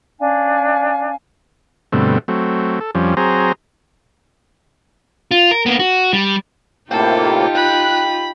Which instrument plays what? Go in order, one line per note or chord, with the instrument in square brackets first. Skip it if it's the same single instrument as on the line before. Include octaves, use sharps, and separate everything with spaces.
[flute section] C#4 D4 F5 G#5
[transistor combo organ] G2 B2 D3 A3 C4
F#3 A3 C4
A4
F2 F3 G3 C#4
F#3 C4 G#4 C5 A#5
[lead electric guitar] F4
A#4
A#3 B3
F#4
G3
[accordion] A2 C3 A#3 [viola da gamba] D#4 F4 G4 [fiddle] A4 [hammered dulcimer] G5
[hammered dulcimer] G5 [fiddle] B5 [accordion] F#6